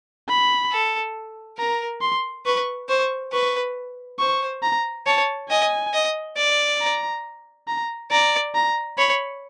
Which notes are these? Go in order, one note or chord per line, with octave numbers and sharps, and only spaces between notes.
B5
A4
A#4 A#5
C6
B4 C#6
C5 C#6
B4 C#6
C5 C#6
A#5
C#5 A5
D#5 G#5
D#5
D5
A#5
A#5
D5 A#5
A#5
C#5 B5